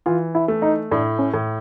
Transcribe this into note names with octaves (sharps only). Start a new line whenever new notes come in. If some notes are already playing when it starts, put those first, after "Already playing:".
E3 F4
E4
A3
D#4
A2 D4
C#4
A2